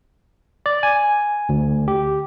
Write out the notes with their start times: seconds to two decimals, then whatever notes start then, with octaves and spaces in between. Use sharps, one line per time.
0.66 D5
0.83 G#5
1.49 D2
1.88 G4